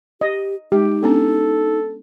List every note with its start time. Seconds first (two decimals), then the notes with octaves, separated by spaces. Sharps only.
0.21 G4 D#5
0.72 G#3 D#4 G4
1.03 B3 C#4 D4 A4